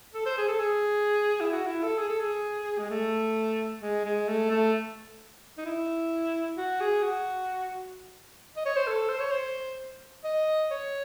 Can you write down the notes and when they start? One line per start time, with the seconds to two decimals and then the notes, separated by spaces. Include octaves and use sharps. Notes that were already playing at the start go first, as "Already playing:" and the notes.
0.14 A4
0.26 C5
0.38 G#4
0.48 A4
0.60 G#4
1.41 E4
1.53 F#4
1.67 E4
1.83 A4
1.98 G#4
2.08 A4
2.20 G#4
2.78 G#3
2.90 A3
3.81 G#3
4.05 G#3
4.28 A3
4.51 A3
5.58 D#4
5.65 E4
6.57 F#4
6.81 G#4
7.03 F#4
8.56 D#5
8.66 C#5
8.76 C5
8.87 A4
9.09 C5
9.20 C#5
9.31 C5
10.24 D#5
10.71 C#5